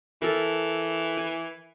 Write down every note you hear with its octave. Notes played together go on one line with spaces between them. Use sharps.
E3 A4 A#4
G#5